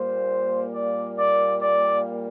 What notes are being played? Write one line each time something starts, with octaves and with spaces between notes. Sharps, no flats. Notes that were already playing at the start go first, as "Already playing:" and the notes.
Already playing: A#2 G3 A#3 C5
D5
D5
D5